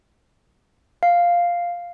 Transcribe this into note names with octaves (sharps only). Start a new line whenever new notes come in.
F5